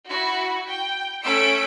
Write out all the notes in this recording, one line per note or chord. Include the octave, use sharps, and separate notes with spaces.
E4 F#4
G5
A3 C#4 E6 B6 D7